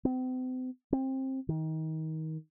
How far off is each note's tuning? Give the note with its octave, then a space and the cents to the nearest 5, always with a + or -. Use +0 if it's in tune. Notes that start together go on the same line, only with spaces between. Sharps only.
C4 -40
C4 +20
D#3 +25